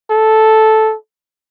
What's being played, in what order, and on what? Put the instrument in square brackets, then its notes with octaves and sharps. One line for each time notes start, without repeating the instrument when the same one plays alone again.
[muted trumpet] A4